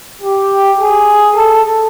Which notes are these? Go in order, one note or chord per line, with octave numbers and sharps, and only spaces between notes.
G4
G#4
A4